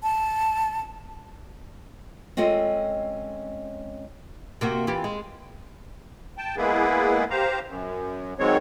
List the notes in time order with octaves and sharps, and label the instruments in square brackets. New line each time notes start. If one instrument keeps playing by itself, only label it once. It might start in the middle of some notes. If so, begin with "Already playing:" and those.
[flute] A5
[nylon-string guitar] G#3 C4 C#4 F4 A4 D#5
[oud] C3 A#3 F#4
E3 F4 G4
G#3
[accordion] G5 A5
G#3 A#3 B3 E4 G#4 B4
G4 C5 F5 A#5
F#2
G#2 D#3 F#3 G#3 C4 C#5